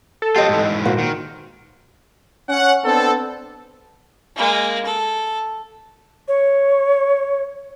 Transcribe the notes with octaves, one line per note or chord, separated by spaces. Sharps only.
A4
F#3 C4 F4 G4 D#5
G#2 E3
A#2 F#4 C5
D#3
C#4 F#5
B3 C4 D4 A4
G#3 A#3
A4
C#5